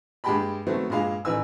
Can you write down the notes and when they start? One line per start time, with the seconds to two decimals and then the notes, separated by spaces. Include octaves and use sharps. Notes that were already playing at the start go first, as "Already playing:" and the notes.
0.24 G2 G#3 G4 G5 A5 B5
0.67 D#3 F#3 A3 B3 C4
0.90 G2 A#2 G#3 F5
1.25 A1 D#3 B4 G#5 E6